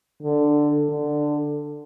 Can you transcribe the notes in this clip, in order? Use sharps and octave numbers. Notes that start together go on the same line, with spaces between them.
D3
D3